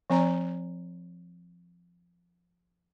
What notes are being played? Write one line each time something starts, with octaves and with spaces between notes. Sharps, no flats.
F3 C4 D5 A#5